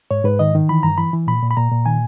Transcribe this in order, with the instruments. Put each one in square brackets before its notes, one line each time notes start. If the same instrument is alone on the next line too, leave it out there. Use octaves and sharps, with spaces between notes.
[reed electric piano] G#2 C#5
G#2 B4
D#3 D#5
D#3
E3 B5
G2 A#5
E3 B5
E3
A#2 B5
A#2
B5
A#2 A#5
A#2
D#3 G#5